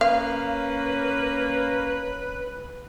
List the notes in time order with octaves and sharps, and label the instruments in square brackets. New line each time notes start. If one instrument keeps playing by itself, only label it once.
[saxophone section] A#3 C#4 [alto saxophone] B4 [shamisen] F5